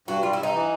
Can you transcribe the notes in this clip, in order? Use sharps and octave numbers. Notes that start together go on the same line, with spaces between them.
G2 F#4
G3 F4
E4
G2 D#4
E3